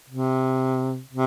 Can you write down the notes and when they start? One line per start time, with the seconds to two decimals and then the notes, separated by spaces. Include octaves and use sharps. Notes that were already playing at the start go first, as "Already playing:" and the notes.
0.09 C3
1.11 C3